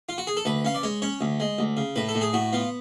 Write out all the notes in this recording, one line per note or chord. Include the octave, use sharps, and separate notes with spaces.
F4
F#4
G#4
A4
D2 B4
C#4 F5
D5
G#3 C#5
C#4 C#5
D2
G#3
D2
C#3
A2 B4
A4
A2
G#4
A2 F#4
B3 F4